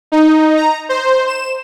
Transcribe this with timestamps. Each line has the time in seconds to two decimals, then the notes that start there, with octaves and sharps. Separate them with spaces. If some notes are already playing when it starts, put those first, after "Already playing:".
0.12 D#4
0.57 A#5
0.89 C5
1.27 E7